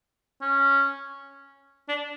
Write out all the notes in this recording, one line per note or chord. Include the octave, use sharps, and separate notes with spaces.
C#4
D4